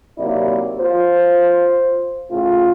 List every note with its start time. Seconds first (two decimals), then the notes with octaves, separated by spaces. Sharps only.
0.18 D#2 C3 F#3 A#3 E4 D5
0.80 F4 C5
2.31 A2 C#3 A3 F4